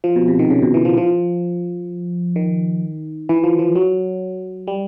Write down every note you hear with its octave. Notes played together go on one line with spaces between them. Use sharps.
F3
B2
C3
D#3
C#3
B2
E3
F3
F3
D#3
E3
F3
F3
F#3
G3